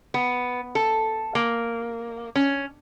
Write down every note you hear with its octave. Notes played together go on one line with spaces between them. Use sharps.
B3
A4
A#3
C#4